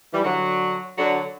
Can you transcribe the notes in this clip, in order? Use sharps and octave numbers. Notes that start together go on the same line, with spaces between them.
E3 G3
D3 F#3
D3 F#3